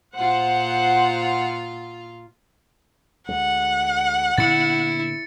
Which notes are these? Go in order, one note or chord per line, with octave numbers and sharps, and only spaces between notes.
A#2 F4 C5 F#5
D2 G#3 F#5
A#2 D3 B3 E4 A6 C#7